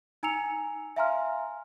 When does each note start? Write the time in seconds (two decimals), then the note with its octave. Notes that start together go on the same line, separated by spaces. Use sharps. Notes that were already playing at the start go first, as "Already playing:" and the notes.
0.23 D#4 G#5 A#5 E6 C#7 F7
0.96 E5 F5 G#5 A#5 C6 F6